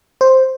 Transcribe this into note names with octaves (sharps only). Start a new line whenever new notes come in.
C5